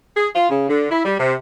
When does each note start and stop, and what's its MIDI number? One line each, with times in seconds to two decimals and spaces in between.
0.16 0.28 68
0.34 0.47 65
0.49 0.66 49
0.69 0.89 50
0.91 1.01 64
1.05 1.15 55
1.19 1.34 48